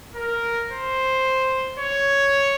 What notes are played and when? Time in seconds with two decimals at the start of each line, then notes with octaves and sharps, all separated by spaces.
0.16 A#4
0.71 C5
1.80 C#5